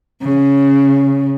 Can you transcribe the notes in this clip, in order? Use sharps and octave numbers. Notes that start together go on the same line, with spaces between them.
C#3